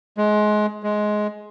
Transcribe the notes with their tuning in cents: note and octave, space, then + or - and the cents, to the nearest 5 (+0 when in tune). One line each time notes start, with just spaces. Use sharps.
G#3 +25
G#3 +15